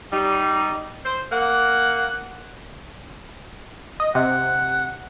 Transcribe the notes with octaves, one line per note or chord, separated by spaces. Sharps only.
G3 D#4
C5
A#3 F#5
D#5
C3 F#5